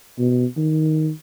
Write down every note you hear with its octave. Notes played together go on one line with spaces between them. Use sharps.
B2
D#3